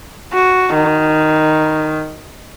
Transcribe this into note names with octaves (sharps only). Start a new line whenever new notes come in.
F#4
D#3